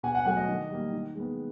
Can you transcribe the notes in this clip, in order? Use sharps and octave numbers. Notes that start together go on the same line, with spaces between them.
B2 F#5 G#5
F#5 G#5
F#3 A3 F#5 G#5
D#5
D#3
G3 A#3
D#3
G#3 B3